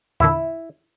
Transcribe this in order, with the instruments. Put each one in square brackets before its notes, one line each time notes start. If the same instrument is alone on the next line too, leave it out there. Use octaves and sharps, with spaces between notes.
[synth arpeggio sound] E2 A#2 D3 [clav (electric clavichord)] E4